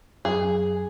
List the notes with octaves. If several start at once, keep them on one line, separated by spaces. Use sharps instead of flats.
F#2 G#4